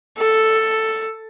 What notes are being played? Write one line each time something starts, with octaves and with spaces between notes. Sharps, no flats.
A4